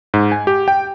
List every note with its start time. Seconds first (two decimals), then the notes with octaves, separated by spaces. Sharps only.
0.14 G#2
0.32 G#5
0.47 G4
0.68 G5